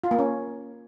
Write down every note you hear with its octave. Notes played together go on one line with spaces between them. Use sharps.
F4
A#3
C#4